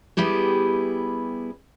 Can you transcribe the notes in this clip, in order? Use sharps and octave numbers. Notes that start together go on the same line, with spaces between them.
G3 B3 E4 G4 G#4